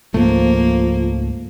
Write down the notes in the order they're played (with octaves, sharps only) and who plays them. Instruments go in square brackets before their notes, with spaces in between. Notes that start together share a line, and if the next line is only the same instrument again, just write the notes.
[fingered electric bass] C#2 G#2 A3 [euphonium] F3 [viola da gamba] A#3